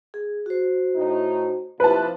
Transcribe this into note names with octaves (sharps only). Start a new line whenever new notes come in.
G#4
F#4 C5
A2 D#4
C3 F3 E4 B4 A5